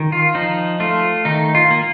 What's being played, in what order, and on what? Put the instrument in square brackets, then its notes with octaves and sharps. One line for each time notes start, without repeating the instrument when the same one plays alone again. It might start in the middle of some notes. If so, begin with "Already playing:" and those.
Already playing: [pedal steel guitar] D#3
F4
F3 D#4
A3 F4
D#3 D#4
F4
A#3